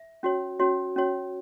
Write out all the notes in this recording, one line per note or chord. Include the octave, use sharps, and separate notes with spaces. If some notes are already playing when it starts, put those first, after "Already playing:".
Already playing: E5
C#4 F#4 C#5
C#4 F#4 C#5
C#4 F#4 C#5